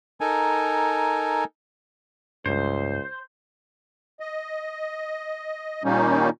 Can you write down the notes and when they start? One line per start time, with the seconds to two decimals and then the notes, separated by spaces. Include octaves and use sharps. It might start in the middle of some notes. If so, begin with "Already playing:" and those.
0.21 D#4 A4 A#4 G#5
2.46 C#2 G2 C5
4.20 D#5
5.84 A#2 D#3 G3 A#3 C#4 D#4